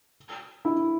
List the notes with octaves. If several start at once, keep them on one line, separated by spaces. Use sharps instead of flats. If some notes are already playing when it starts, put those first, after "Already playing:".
E4